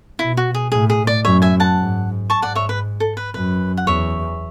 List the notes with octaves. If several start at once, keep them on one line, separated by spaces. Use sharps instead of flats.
B2 E4
F#4
G#4
A2 G#4
G#4
D5
F#2 C#5 E5
E5 G#5
F#5 A5
G#2
G#2 A5 C#6
D5 F#5
C#5 E5
B4
A4
B4
F#2 B4
F#5
E2 C#5 E5